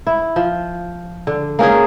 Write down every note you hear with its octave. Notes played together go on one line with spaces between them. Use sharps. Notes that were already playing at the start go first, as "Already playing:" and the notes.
E4
F3
D3
A#3 C#4 D#4 G#4